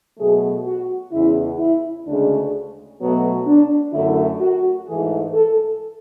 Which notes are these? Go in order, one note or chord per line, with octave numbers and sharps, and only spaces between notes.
B2 F#3 A3 G#4
F#4
E2 C#3 G#3 E4
E4
D2 C#3 G#3 D4
B2 F#3 A3 B3
D4
F#2 D3 F#3 A3 E4
F#4
G#2 E3 A3 G#4
A4